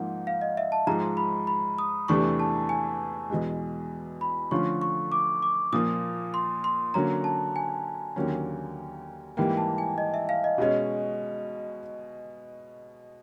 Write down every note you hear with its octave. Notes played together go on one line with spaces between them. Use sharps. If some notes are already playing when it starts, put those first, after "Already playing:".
Already playing: G#2 F3 A#3 D#4 F#5
F5
D#5
E5
A5
G#2 F3 G#3 A#5
B5
B5
D#6
E2 C3 E3 A3 D4 C#6
A5
G#5
E2 B2 G#3
B5
D3 F3 A3 C#4 F4 C#6
C#6
D6
D6
A#2 F3 A#3 D#6
C6
C6
D3 F#3 A#3 C#4 A#5
A5
G#5
D#2 D3 F#3 A#3 C#4
G#2 E3 G3 A#3 G5
A5
G#5
D#5
E5
F5
D#5
B2 G#3 C#4 D#5